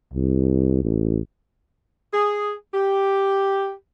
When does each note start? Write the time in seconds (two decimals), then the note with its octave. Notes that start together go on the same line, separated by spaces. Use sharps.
0.13 C2
0.83 A1
2.14 G#4
2.74 G4